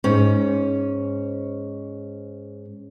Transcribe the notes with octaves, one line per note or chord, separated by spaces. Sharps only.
G#2 C#4